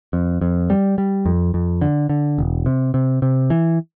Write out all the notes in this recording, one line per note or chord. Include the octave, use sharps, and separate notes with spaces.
F2
F2
G3
G3
F2
F2
D3
D3
E1
C3
C3
C3
E3